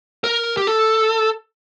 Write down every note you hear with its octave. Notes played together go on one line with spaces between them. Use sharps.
A#4
G4
A4